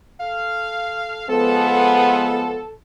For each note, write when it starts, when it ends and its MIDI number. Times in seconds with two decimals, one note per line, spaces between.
0.20 1.28 69
0.20 1.28 77
1.29 2.63 53
1.29 2.63 56
1.29 2.63 59
1.29 2.72 69